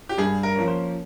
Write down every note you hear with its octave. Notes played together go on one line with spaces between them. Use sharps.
G4
G2 G#4
A#4
F3 A#3 C#4
C5